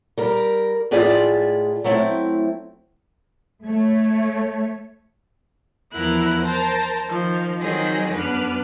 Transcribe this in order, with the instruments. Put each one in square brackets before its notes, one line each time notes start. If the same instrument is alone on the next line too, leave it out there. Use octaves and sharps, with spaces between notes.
[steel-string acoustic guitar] G3 A#4
A2 G#3 F4 G#4 D5 E5
F#3 A3 C4 E4
[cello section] A3 C#5
[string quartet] E2 F3 B3 E4 A#4 F#6
A#4 C5 A5
D#3 F3
D#3 F#3 C4 G#4 G6
F#2 B3 D4 B4 F6